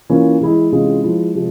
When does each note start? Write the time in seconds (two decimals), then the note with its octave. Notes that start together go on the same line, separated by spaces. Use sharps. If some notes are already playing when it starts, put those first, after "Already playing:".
0.10 E3 A#3 C#4 F4
0.41 E3 G#3 E4
0.72 C3 E3 G#3 C#4 F4
1.03 F3 G#3 E4
1.35 C3 F3 G#3